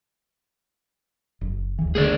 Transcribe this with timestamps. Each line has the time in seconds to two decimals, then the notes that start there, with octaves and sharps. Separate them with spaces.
1.41 F#1
1.79 D1 E3
1.95 C#2 D3 A3 G#4 A#4 D5